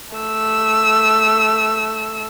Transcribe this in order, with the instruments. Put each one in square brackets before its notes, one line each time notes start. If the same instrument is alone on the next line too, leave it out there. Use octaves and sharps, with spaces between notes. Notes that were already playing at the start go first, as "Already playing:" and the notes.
[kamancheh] A3 E6